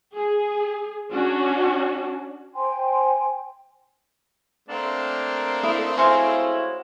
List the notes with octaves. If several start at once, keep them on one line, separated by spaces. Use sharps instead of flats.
G#4
C#4 D4 F#4
C5 G5 G#5 C6
A3 A#3 C4 D4
E4 A4 A#4 D#5
G#3 C#4 E4 F#4 C5 E5 F5 G#5